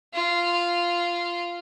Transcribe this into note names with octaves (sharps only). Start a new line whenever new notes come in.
F4